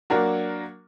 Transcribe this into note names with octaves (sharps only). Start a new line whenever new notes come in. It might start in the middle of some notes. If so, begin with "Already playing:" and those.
F#3 A#3 D4 F#4 A#4